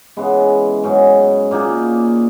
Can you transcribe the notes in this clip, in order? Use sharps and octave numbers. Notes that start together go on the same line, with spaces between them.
C#3 E3 G#3 B3
G#2 F#3 C#4 G#4
A#2 A#3 D#4 G#4